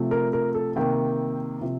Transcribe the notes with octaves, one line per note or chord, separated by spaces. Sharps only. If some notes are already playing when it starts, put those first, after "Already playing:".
Already playing: C3 F3 A3
A#4
A#4
A4
C3 D#3 A#3 G5
C3 F3